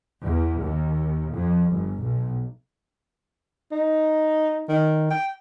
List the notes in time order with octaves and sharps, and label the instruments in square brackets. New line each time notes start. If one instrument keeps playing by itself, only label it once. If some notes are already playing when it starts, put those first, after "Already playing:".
[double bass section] E2
D#2
F2
G1
B1
[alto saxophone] D#4
D#3
G5